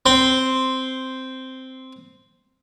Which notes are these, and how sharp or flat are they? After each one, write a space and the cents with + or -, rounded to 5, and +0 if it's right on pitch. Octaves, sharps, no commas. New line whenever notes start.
C4 -5 C6 +0